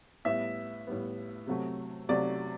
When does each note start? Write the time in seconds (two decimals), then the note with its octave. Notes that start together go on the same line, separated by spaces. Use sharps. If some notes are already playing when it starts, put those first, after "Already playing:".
0.25 A2 G3 B3 E5
0.87 A2 G3 B3
1.47 C3 F#3 A3
2.09 C3 F#3 A3 D5